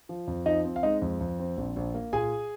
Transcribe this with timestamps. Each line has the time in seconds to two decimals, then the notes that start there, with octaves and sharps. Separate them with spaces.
0.09 F3
0.28 F2
0.46 F3 D#4 D#5
0.65 C4
0.76 F5
0.83 G#3 D#4 D#5
1.02 F2
1.21 F2
1.39 C4
1.57 A#1
1.76 A#1
1.95 A#3
2.13 A#2 G#4 G#5